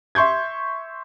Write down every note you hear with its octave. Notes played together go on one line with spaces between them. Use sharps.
E5 C6 C#6 G6 G#6